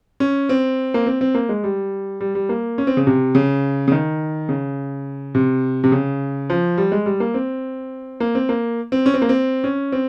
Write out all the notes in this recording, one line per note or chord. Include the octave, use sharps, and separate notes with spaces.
C#4
C4
A#3
C4
C4
A#3
G#3
G3
G3
G3
A#3
C#4
C4
C#3
C3
C#3
C#3
D#3
C#3
C3
C3
C#3
F3
G3
G#3
G3
A#3
C4
A#3
C4
A#3
C4
C#4
C4
A#3
C4
C#4
C4